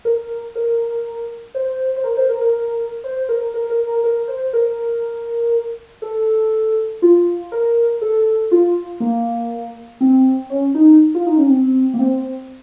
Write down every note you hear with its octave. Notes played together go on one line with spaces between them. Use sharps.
A#4
A#4
C5
C5
A#4
C5
A#4
A#4
C5
A#4
A#4
A#4
A#4
A#4
C5
A#4
A4
F4
A#4
A4
F4
A#3
C4
C#4
D#4
F4
D#4
C#4
C4
A#3
C4